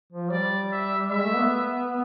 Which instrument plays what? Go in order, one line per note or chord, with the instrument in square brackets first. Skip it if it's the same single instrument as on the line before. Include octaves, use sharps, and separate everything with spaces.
[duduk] F3
[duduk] G3 [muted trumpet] D5
[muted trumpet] E5
[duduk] G#3 [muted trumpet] E5
[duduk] A3
B3